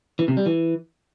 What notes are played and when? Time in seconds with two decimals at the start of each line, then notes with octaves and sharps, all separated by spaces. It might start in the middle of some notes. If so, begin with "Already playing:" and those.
0.19 E3
0.28 C3
0.37 G3
0.46 E3